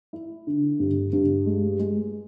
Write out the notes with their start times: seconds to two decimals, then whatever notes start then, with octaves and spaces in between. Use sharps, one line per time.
0.13 E4
0.47 D3
0.80 G2
1.13 G2
1.46 G#3
1.79 G#3